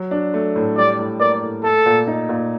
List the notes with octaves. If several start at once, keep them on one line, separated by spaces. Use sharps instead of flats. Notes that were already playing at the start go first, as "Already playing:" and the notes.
Already playing: F#3
D4
A3
A2
G3 D5
A2
A#3 D5
A2
A3 A4
A#2
D#4
A#2